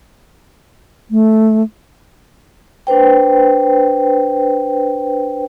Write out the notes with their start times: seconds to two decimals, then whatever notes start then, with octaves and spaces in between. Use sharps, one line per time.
1.11 A3
2.87 D4 B4 C5 G5